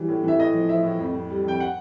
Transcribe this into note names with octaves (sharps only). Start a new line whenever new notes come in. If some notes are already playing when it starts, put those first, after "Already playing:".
Already playing: E3 F#3 G3
A2
E3 E5
A2 D#5
F3
F3 E5
A2
F2
F2
G3
F2 G5
F#5